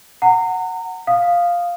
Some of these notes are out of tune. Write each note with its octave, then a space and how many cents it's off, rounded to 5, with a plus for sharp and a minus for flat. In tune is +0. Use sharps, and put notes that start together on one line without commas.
F#5 +0 A#5 -30
F5 +0 D#6 -10